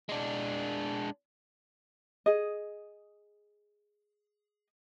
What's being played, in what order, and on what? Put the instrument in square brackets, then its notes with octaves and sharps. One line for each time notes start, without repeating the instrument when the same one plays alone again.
[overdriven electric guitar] G#3 D4
[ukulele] G#4 D#5